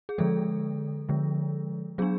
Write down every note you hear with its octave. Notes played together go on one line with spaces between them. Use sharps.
G#4
D3 F3 G#3 A4
D3 F3 G#3
F#3 B3 D4 G#4